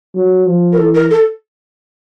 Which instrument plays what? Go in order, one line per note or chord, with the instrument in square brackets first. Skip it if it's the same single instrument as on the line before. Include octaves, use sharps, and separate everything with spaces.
[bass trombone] F#3
F3
[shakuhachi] A#4
[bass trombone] E3 [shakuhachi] A4
[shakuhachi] A#4
A4